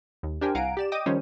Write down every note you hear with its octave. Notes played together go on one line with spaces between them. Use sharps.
D#2
D4 G4 A#4 C5 G5 G#5
C2 F5 F#5 G#5 A#5 D7
G4 D5 E7
D#5 G5 D6 D#6 D#7
D#3 F3 G3 C#4 C5 C#5